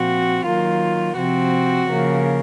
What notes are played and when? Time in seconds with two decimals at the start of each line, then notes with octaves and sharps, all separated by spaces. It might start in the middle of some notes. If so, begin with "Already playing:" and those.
Already playing: A#2 F3 C4 F#4
0.46 D#3 F#3 A#3 F4
1.16 C3 F3 C4 F#4
1.87 C#3 F3 A#3